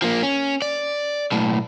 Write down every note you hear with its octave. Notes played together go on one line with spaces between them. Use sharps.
F3 A#3
C#4
D5
B1 A2